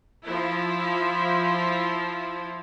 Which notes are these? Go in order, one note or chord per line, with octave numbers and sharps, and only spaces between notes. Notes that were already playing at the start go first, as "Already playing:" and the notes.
F3 E4